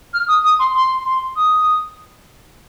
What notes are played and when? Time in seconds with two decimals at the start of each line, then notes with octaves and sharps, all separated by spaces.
0.13 F6
0.27 D#6
0.44 D#6
0.59 C6
0.75 C6
1.05 C6
1.35 D#6